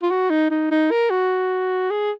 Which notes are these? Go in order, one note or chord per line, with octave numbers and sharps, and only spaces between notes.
F4
F#4
D#4
D#4
D#4
A#4
F#4
G#4